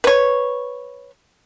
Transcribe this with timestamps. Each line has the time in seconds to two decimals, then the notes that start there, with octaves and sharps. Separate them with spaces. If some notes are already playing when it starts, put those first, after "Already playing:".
0.04 B4 C#5